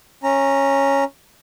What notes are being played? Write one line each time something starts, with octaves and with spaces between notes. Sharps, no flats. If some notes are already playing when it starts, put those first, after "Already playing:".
C#4 A#5